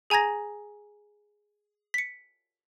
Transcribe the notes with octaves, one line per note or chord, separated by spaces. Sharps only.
G#4 G#5 A#5 G#6 A#6
B6 C#7